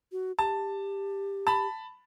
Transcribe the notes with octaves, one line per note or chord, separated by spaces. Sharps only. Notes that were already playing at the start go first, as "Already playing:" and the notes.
F#4
G4 A5
A5 B5